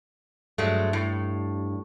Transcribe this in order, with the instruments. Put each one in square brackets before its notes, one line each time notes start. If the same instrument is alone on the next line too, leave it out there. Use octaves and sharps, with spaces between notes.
[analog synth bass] G2 [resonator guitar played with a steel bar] F#3 G#3 A3
[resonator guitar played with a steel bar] A2